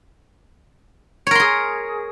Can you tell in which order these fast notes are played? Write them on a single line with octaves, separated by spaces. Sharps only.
C#5 A#4 C6 G#4